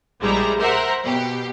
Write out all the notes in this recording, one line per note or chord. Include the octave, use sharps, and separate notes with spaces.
A#1 G3 G#3 E4 A#5
A#4 C5 E5 F#5 A#5
B2 G4